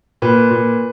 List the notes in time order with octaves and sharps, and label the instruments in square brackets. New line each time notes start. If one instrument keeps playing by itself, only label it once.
[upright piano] A#2 B4
A#2